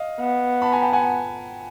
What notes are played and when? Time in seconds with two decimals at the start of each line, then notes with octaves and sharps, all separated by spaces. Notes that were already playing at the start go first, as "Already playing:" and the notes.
Already playing: D#5 F5
0.20 B3
0.62 A5 B5
0.72 G#5 A#5
0.82 G5 A5
0.93 F#5 G#5